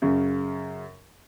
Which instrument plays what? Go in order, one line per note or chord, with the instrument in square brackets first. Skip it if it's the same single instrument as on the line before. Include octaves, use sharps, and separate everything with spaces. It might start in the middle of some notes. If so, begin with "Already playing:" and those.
[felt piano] F#2 C#3